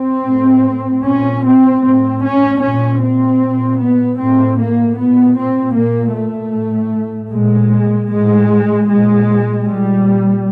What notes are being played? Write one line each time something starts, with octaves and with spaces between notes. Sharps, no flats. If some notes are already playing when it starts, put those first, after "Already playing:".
Already playing: C4
A2
A#2 C#4
C4
A2 C4
C#4
A#2 C#4
C4
A#2
B3
A2 C4
A#3
A#2 B3
C4
A#2 A#3
A3
A2
A#2 G#3
A2 G#3
A#2 G#3
A#2 G3